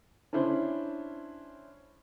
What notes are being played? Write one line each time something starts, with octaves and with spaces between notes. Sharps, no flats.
C#4 D4 E4 C5